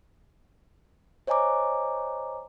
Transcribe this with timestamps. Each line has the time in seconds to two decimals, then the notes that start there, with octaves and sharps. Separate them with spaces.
1.27 C5 C#5 D#5 G#5 A#5 D6